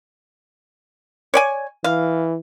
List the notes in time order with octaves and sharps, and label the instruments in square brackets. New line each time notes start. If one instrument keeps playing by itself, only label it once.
[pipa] C#5 D5 G#5
[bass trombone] E3 [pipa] F5